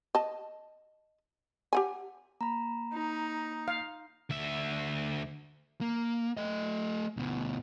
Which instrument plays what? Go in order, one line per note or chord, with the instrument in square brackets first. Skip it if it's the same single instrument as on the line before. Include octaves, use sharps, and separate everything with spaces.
[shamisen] D#5 A5
G4 F#5 G#5
[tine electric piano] A#3 [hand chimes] A#5 B5
[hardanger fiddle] D#4
[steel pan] F5
[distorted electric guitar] D2 E5
[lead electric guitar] A#3
A3 D#5
D2 B2